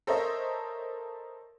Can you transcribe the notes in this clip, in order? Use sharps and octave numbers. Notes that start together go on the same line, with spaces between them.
A4 A#4 C5 C#5 D#5 E5